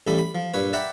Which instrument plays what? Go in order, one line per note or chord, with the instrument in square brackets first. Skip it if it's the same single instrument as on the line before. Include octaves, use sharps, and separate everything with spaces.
[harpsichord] A1 A2 G3 A4 B5
B5
F3
G2 A#2 B4 C#5
D5 E5 F#5 G5 A#5 B5